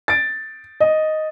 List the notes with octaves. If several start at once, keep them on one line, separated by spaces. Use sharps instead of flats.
A6 D7
D#5